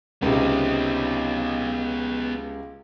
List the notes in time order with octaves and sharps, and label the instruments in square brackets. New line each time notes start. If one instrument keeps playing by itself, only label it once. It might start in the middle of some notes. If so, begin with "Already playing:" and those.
[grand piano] C#2 C3 [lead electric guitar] B3 D#4